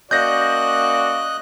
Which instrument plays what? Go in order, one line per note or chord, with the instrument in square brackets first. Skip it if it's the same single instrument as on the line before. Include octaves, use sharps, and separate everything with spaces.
[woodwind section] A#3 C#4 F#4 [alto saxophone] D5 [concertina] D#5 F#6 [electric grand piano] G6 A#6